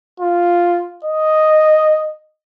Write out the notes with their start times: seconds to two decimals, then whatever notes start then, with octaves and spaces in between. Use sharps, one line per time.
0.20 F4
1.04 D#5